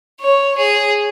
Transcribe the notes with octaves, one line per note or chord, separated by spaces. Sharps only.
C#5
G#4